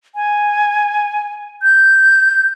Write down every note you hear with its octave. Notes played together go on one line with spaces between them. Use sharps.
G#5
G6